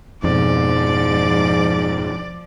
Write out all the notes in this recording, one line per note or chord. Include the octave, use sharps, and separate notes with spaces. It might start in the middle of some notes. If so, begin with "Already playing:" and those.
F2 G#2 B2 F3 D5